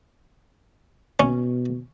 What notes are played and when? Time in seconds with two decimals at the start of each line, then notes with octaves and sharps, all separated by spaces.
1.20 B2 C#4